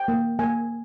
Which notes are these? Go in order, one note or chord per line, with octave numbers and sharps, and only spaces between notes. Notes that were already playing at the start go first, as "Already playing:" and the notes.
Already playing: G5
A#3
A#3 G#5